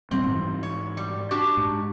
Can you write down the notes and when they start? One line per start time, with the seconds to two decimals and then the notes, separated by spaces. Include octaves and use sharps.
0.11 D#1 G3 B3 C4
0.27 G#2 E3
0.63 C#5
0.97 G3
1.31 D4 F#4 G4
1.57 G#2